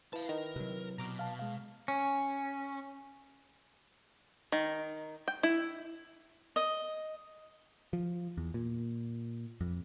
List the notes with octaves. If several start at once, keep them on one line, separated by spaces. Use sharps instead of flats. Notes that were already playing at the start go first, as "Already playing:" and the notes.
E4 B4 F5 A5
D#3 A#4
C3 F#3
B2 A#5 D6 F6
F5 A5
G#3 F5
C#4
D#3
G5
E4
D#5
F3
E2
A#2
F2